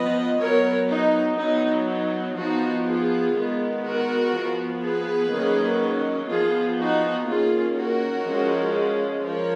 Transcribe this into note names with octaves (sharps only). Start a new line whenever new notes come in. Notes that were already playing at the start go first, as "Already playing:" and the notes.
Already playing: F3 B3 B4 D#5
F#3 B3 A#4 C#5
D#4
F#3 B3 D#4
D#4
F3 B3 D#4 F#4
F4 G#4
D#3 G#3 B3
F#4 A#4
F3 B3
G#4 B4
D#3 F#3 A#3 C#4
F3 B3 F4 G#4
D#4 F#4
D#3 A#3 C#4 F4 G#4
F#4 A#4
F3 G#3 C#4
F3 A#4 C#5